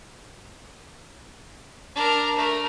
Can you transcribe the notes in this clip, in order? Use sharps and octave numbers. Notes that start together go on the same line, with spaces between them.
D4 A#4
A3 A#4